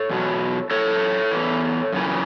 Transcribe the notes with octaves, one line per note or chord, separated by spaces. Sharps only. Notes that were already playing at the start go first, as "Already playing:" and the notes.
Already playing: A4 C#5
E2 B2 F#3
F#2 E3 A4 C#5
E2 E3
F#2 C#3 E3